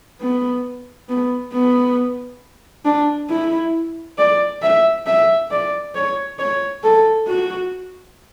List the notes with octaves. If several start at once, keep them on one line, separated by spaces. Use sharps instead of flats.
B3
B3
B3
D4
E4
D5
E5
E5
D5
C#5
C#5
A4
F#4